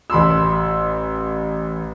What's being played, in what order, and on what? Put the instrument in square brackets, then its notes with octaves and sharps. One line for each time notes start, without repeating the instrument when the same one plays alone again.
[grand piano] A1 B5 C6 E6